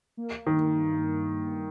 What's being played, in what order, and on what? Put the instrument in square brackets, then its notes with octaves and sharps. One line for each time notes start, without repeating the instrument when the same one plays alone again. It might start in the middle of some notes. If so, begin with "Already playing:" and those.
[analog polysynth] A#3
A#3
[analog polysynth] G2 [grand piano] D#3
[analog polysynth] A#3